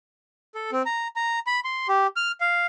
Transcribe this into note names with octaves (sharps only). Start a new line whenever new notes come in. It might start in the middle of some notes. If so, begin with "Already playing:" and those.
A4
C4
A#5
A#5
B5
C6
G4
F6
F5